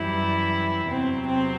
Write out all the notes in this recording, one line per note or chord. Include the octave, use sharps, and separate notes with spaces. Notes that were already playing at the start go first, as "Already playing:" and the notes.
Already playing: F#2 E3 G3 E4
E2 C3 F#3 C4
C4